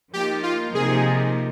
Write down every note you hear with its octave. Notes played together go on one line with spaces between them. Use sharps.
F3 A#3 D#4 G4
F4
C3 F3 A#3 D#4 G4 G#4